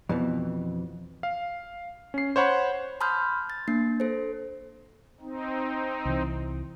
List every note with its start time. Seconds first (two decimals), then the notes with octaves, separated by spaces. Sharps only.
0.09 F2 B2 E3
1.23 F5
2.14 C#4 C7
2.36 C5 C#5 F#5 B5
3.01 A5 B5 C6 D#6 F6 G6
3.50 A6
3.68 A#3 D4 C7
4.00 A4 C5
5.20 C4 D#4
6.05 C2 E3